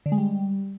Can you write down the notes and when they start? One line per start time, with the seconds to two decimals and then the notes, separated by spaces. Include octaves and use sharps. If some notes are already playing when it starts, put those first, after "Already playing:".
0.06 D3
0.12 G#3
0.18 G3